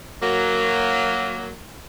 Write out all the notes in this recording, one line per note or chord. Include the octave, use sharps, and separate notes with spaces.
F#3 A#3